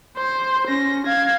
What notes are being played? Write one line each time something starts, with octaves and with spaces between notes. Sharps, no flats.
C5
C#4 A#6
F5 G#6